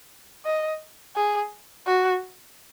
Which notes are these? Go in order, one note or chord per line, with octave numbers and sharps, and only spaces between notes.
D#5
G#4
F#4